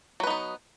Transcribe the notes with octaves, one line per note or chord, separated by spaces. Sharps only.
F#3 B3 D#4 B4